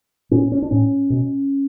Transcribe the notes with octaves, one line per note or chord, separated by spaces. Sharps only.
A#2 C#4
C#4
D4
A2 C#4
B2